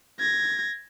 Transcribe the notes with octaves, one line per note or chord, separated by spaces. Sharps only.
G#6 A#6